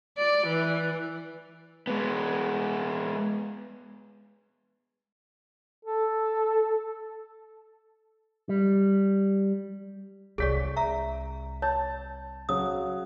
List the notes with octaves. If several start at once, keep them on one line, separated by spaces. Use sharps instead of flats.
D5
E3
G#3 B3
A4
G3
C2 G#4 C#5 D5 C#6 B6 D7
E5 A#5
C#5 A5
C#3 F#3 D#6